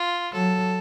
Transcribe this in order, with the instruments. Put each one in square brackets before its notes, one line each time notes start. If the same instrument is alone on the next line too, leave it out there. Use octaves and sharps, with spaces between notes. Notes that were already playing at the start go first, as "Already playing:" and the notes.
Already playing: [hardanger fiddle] F4
[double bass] F#3 [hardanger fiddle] A4